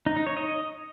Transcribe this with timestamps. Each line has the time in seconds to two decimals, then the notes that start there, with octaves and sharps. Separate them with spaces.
0.06 D#4
0.16 D#4
0.27 C#5
0.37 D#5